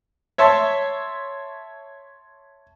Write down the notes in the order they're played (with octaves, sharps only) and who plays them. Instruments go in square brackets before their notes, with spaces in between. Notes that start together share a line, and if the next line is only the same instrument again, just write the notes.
[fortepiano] C#5 E5 A5 C6